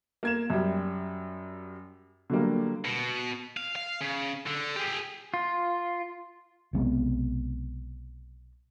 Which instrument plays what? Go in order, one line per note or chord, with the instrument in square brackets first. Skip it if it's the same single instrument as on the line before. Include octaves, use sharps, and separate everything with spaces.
[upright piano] A#3 G#6 E7
F#2 G3
D3 F#3 G3 A#3
[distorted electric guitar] B2
F5
F5
C#3
D3
G4 G#4
[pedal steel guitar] F4
[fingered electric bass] B1 C3 G#3 B3